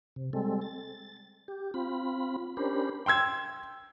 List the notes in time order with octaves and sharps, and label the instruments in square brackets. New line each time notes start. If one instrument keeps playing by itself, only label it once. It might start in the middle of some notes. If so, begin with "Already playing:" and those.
[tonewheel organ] C3
G3 G#3 C4 A4
A6
G4
C4 F4 B5
C#4 D4 G4 A#4 C5 B5
[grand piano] G5 C6 E6 G#6